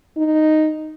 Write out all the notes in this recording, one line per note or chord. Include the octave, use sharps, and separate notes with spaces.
D#4